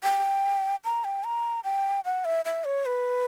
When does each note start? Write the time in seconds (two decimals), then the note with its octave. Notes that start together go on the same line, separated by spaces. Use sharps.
0.03 G5
0.84 A#5
1.04 G5
1.24 A#5
1.64 G5
2.05 F#5
2.25 E5
2.45 E5
2.65 C#5
2.86 B4